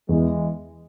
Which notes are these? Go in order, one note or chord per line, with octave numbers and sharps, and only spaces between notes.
E2 E3 G#3